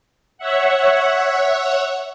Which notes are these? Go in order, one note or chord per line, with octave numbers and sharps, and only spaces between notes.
C#5 E5 F#5